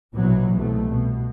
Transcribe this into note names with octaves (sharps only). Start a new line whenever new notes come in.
A#1 B2 E3 F#3
C2 B2 A3
B2